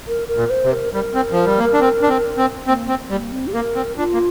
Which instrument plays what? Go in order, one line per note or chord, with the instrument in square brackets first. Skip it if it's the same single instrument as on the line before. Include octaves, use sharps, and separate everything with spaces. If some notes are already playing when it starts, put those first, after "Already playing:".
[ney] A#4
A#4
[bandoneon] A#2
[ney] C5
[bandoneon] C3
[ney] A#4
[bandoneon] G3 [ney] A#4
[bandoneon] C4
F3
G3
A#3
D4
C4
D4
C4
C4
[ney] A#3 [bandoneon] C4
[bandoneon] C4
[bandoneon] G3 [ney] A#3
[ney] C4
G4
[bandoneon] A#3 [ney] A#4
[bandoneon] C4
[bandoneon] D4 [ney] F4
[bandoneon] A#3